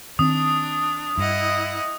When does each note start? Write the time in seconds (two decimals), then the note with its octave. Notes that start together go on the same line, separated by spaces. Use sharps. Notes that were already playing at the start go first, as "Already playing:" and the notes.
0.19 D#3 C4 D4 D#6
1.18 G2 E4 D#5 F#5